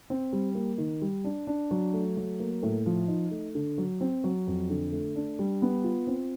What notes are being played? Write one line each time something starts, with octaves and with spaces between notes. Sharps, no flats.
C4
G3
A#3
D#3
G3
D4
D4
F#3
A3
F#3
A#3
A2
F3
D#4
A3
D3
F#3
C4
F#3
F2
D3
A3
D4
G3
B3
F4
C4